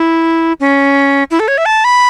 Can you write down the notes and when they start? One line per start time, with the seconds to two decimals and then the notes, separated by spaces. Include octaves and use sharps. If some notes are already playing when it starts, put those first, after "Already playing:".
Already playing: E4
0.60 C#4
1.31 E4
1.40 A4
1.48 C#5
1.58 E5
1.66 A5
1.84 B5